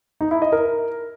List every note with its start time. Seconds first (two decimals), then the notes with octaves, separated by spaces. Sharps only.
0.21 D#4
0.31 E4
0.42 D#5
0.52 A#4